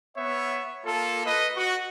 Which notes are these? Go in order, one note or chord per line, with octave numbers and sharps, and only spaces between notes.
B3 C#5 E5
A#3 F4 A4
B4 D#5
F#4